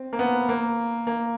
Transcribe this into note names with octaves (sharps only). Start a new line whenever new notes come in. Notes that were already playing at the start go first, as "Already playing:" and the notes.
Already playing: C4
A#3
B3
A#3
A#3